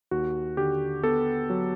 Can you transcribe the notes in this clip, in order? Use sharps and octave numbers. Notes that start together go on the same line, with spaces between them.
D#2 F#4
D3 G4
B3 A4
F#3